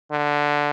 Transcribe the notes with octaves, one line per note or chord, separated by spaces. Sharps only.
D3